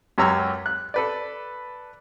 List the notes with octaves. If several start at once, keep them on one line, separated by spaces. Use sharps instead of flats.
C#2 F#2 G4 C#5 A#5 E6
F#6
A4 B4 D5